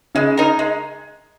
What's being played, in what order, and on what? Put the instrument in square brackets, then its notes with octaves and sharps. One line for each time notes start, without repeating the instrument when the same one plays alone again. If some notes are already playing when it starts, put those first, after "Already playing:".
[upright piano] C#3 [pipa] G#3
[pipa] D#4 A#4
G#3